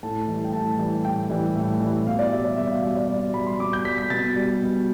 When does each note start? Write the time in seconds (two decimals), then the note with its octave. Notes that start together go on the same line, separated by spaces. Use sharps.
0.03 A2 A5
0.27 E3 G3
0.44 G5
0.53 A2 A5
0.79 E3 G3
1.04 A2 G5
1.30 E3 G3
1.55 A2
1.81 E3 G3
2.06 B2 F5
2.19 D5
2.32 G3 E5
2.44 D5
2.57 B2 E5
2.70 F5
2.83 G3 E5
2.97 D5
3.09 B2 D5
3.34 G3 B5
3.47 C6
3.60 B2 D6
3.73 G6
3.85 G3 B6
3.98 B6
4.10 B2 A6
4.36 G3
4.62 B2